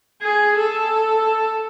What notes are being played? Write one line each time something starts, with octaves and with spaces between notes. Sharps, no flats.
G#4
A4